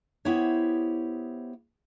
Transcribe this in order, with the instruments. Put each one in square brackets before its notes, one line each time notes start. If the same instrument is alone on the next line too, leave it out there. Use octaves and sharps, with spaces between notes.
[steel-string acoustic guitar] B3 E4 G4 C5 C#5 E5